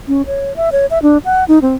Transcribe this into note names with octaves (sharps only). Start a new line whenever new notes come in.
C#4
C#5
E5
C#5
E5
D4
F#5
D#4
C4